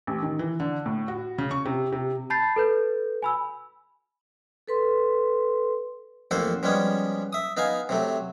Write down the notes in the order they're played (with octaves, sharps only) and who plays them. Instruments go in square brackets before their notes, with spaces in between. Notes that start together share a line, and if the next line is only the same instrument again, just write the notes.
[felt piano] A1
D#3
E3
D3
A2
F#4
C#3
C#6
C3
C3
[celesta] A5 B5 G6 A6 C7
A4 B4 G6
G#5 B5 E6
[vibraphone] A4 B4 C6
[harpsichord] A1 F2 A#3 A4 C5 F#5
F3 G3 G#3 B3 C#4
E5 D#6
B3 D#4 F5 G#5
C3 F#3 A3